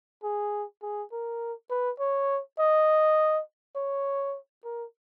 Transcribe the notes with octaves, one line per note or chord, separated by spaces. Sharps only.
G#4
G#4
A#4
B4
C#5
D#5
C#5
A#4